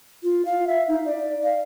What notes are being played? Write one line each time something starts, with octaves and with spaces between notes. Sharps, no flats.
F4
F5
E5
D#4
D5
F5